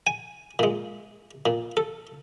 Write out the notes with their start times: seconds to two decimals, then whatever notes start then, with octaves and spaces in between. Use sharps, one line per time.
0.07 G#5
0.59 A#2 G#3
1.46 A#2
1.77 A4